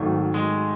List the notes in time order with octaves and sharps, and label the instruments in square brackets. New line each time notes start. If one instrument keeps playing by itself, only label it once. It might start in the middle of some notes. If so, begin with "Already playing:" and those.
Already playing: [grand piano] G#1 G#2 D#3 F#3 A3
[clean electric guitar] G#3